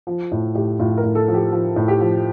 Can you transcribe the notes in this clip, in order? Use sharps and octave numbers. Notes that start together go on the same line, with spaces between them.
F3
A2
A2 G4
A2 F4
A#4
A2
A4
F3
G4
F3
A2
G4
F3